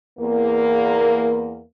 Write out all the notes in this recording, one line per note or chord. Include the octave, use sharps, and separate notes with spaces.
E2 A#3